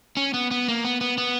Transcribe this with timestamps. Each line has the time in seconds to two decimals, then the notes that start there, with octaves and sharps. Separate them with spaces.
0.17 C#4
0.34 B3
0.51 B3
0.68 A#3
0.84 B3
1.01 B3
1.18 B3